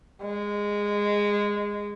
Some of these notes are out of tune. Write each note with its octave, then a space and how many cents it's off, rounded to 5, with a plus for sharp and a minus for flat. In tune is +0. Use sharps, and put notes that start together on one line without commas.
G#3 -15